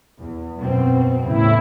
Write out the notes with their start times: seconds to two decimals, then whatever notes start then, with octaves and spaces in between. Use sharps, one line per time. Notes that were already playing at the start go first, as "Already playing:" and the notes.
0.19 E2
0.58 F#2 B2 C4
1.26 E2 A2 C#3 E4